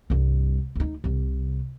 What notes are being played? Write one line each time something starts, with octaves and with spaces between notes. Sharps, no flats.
C2 G2
D2 D#4
C2 C3